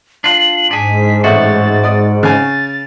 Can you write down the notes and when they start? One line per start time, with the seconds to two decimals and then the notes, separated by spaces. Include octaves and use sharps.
0.24 D4 F4 F#7
0.71 G#2 D4 G#4 B6
1.24 A1 A2 F#4 A6
1.83 D5 D#6
2.23 C#3 G#5 A6